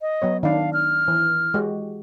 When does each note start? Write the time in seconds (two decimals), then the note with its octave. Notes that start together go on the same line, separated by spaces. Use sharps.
0.01 D#5
0.22 F#3 B3 C#5
0.43 D#3 D4 F5
0.73 F6
1.08 E3
1.54 G#3 F#4 G4